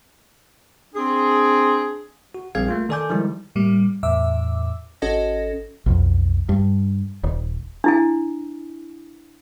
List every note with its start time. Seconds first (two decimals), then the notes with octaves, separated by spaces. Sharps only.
0.95 C4 D4 G#4
2.35 F#4
2.55 A#1 G3 C4 G#4 F5 G#6
2.69 A3 A#3 F4
2.89 D#3 A4 D5 G#5 D6 G6
3.10 D#3 F3 G3 G#3 E4
3.55 A2 G3 A#3
4.03 E2 A2 E5 D6 E6
5.02 G#1 C#4 F#4 A4 D#5 A#6
5.86 B1 F2
6.49 G2
7.24 D#1
7.84 D4 E4 G#5